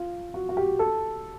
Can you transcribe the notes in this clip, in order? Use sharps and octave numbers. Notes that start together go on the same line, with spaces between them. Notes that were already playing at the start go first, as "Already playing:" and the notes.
Already playing: F4
F#4
F#4
G4
A4